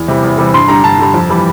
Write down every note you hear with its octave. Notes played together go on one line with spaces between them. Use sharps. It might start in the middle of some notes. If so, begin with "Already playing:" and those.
Already playing: E2
C3 E3 G3
E2
C3 E3 G3
G2 C6
D3 G3 A#5
G2 A5
D3 G3
F2
E3 G3